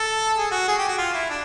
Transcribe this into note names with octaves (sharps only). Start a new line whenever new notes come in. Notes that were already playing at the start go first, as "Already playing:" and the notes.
Already playing: A4
G#4
F#4
G#4
G4
F#4
F4
E4
D4